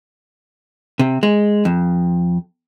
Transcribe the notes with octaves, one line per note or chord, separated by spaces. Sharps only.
C3
G#3
F2